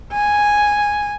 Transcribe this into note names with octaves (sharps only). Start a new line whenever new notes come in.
G#5